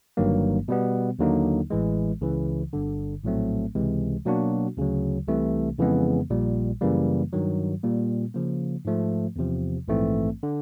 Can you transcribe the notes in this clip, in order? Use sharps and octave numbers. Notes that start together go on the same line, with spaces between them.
G1 G2 D#3 F#3 A#3
B2 G3 B3
D#2 D3 F#3 A#3 D#4
A1 A2 E3 G#3
C#2 C#3 E3
G1 G2 D3
A#1 A2 F#3 A3 C4
C#2 C3 E3 G#3
B2 F#3 A#3 D4 F#4
D2 C#3 F#3
C2 C3 E3 A3
F2 C#3 E3 G#3 B3
A#1 A#2 G3
F#2 C#3 E3 G3 A#3
G2 D#3 F#3
A#2 G3 A#3
C#3 F3 A#3
G#2 F3 A3
E2 C3 F3
A#1 G#2 E3 A3 C4
D3